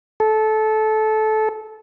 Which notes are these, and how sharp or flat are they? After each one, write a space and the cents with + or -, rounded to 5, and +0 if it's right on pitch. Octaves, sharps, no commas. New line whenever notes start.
A4 -20